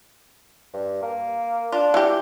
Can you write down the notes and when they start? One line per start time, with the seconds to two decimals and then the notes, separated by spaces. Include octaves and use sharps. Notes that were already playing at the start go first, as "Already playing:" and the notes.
0.74 G2
1.02 A#3
1.72 D4 F4
1.94 E3 G4